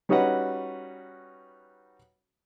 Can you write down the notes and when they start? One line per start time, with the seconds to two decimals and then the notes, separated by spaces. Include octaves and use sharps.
0.09 G3 C#4 D#4 F#4 B4 F#5